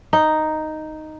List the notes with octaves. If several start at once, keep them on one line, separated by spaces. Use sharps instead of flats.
D#4